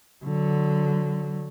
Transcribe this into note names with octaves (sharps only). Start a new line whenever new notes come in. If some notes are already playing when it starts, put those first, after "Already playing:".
D3 F#3